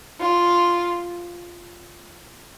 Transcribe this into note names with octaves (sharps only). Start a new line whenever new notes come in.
F4